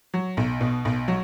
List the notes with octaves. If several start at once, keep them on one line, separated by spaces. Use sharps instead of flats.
F#3
B1
B2
B1
F#3